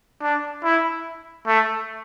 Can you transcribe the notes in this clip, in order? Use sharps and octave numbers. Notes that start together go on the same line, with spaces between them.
D4
E4
A3